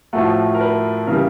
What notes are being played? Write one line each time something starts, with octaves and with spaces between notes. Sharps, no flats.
A2 F3 A3 F#4
A#4
B4
C#3 E3 G3 A#4